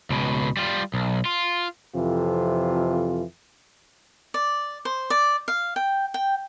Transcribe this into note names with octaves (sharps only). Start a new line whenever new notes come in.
C#2 B2
G3 F4
B1
F4
F2 C3 E3 F4 A4
D5
C5
D5
F5
G5
G5